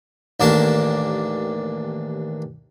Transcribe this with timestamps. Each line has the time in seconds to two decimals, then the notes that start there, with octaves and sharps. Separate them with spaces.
0.40 A1 D#2 A#3 D4 A5